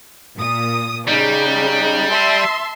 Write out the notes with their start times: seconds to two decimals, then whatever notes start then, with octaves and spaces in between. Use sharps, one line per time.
0.37 A#2 D#6
1.07 C#3 G3 D#4
2.10 E5 A5 C6